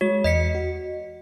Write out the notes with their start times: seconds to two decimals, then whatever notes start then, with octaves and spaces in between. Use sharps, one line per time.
0.01 G#3 F#4 C#5
0.24 E2 D#5 B6 C#7
0.55 F#4